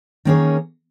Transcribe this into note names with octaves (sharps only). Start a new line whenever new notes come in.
D#3 A#3 C#4 G#4 C#5